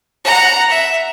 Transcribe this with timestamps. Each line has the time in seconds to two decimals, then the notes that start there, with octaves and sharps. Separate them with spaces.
0.25 F#5 A#5
0.70 E5